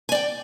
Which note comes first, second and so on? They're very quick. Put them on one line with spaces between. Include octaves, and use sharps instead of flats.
G#5 D5 G5